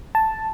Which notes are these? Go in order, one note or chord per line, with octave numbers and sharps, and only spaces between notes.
A5